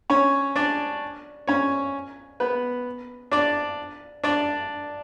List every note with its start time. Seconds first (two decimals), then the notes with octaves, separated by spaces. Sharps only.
0.10 C#4 C#5
0.56 D4 D5
1.47 C#4 C#5
2.40 B3 B4
3.32 D4 D5
4.24 D4 D5